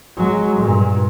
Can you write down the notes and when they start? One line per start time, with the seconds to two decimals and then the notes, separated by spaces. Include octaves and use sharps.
0.17 F#3 G#3
0.60 G2 A#2